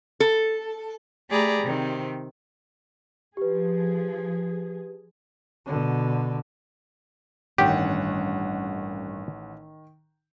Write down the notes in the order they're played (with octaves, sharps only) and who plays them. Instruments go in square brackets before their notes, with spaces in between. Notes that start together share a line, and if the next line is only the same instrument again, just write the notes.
[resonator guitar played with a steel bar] A4
[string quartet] A3 G4 G#4 D5 A#5 B5
C3 D#3 C4
[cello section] F3 G#4 [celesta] G4 B4
[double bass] B2 D3
[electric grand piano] A1 F#5 [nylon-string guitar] G2 C#4 [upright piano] D#3 [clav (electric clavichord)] G4